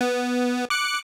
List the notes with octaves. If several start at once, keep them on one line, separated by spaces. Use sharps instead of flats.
B3
D6 F#6 C#7